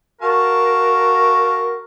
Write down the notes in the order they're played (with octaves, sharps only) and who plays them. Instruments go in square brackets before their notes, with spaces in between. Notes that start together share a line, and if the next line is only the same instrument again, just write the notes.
[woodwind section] F#4 A#4 [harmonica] F5 A5 C#6